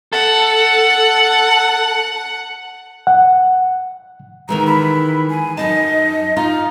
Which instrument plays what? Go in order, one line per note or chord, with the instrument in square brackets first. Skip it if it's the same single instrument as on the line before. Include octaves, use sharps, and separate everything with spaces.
[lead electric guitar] A4 [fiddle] F#5
[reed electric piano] F#5
[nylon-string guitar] D#3 E3 G#3 [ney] A#5
[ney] B5
G#5
[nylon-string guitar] F#2 D#4 A5 [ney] D#5
[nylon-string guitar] D#4 F4 [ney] A#5